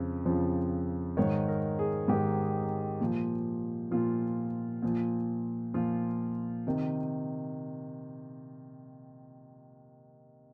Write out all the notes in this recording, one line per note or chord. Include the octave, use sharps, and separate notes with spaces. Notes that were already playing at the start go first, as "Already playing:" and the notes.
Already playing: F2 C#3 F3
F2 C#3 F3
G#2 D#3 C#5
A#4
G#4
G#2 D#3 G4
A#2 F3
A#2 F3 F4
A#2 F3
A#2 F3 F4
C3 D#3